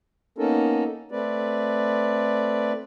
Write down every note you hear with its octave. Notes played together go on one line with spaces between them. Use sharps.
A#3 B3 C#4 D#4 A4 A#4
A3 C4 B4 D5